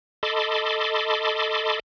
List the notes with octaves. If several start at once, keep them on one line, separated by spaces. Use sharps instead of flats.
A4 D#5 A5 B5 C6 D6